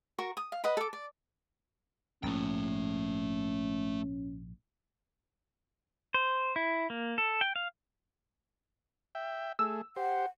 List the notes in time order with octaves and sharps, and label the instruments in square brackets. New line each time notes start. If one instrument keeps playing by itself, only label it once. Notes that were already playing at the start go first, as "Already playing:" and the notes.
[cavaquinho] F#4 A#4 C#6
D#6
F5
B4 D#5 F#5 B5
A4 D6
D5
[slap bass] A#1 G#2 [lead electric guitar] A3 G5 [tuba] C#4
[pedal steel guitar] C5
E4
A#3
A4
G5
F5
[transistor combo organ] E5 G5
[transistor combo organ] A3 G#4 [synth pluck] E6
[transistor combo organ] G4 C5 [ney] F#5